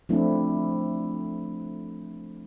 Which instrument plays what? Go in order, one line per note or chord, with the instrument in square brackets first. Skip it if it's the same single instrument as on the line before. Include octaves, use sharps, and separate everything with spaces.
[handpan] F3 A3 C4 D4 E4